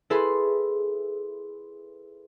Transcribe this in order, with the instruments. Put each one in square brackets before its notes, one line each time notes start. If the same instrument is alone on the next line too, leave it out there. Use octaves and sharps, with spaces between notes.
[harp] E4 G#4 A4 B4 B5 C6